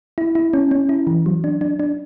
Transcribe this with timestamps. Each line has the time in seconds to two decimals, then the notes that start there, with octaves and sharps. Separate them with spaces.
0.18 E4
0.35 E4
0.54 C#4
0.71 C#4
0.89 E4
1.07 E3
1.26 F#3
1.44 D4
1.61 D4
1.80 D4